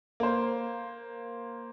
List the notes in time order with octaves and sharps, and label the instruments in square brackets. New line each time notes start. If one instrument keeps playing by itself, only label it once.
[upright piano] A#3 C5